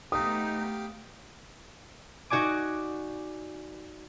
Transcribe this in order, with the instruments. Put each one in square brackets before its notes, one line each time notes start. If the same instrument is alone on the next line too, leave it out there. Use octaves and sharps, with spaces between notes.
[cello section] A3 B3 [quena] D#4 [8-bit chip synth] G4 F5 G5 [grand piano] D#6
[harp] D#4 F#4 D5 G#5 D6